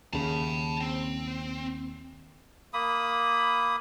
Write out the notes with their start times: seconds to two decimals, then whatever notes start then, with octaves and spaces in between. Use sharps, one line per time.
0.13 D#2 C#3 A5 B5
0.81 C4
2.74 A#3 B5 D#6